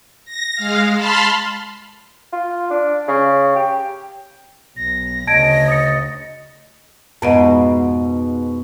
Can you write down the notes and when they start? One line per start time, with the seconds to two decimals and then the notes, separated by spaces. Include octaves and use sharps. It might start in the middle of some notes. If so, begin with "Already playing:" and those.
0.25 A#6
0.55 G#3 F5
0.94 A5 B5 C6 F6
2.33 F4
2.70 D4
3.08 C#3
3.56 G4
4.77 B1 A#6
5.27 D2 C#3 D#5 A5 G#6 D7
5.68 D#6 A6 C#7
7.22 F2 G#2 B2 B3 D#5